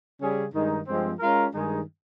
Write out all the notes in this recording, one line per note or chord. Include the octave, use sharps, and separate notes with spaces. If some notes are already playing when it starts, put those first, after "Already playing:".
C#3 G3 C#4 G#4
G2 D#3 G#3 D#4
G2 F3 G#3 C4
G#3 C#4 F4 A#4
G2 D#3 G#3 D#4 G#4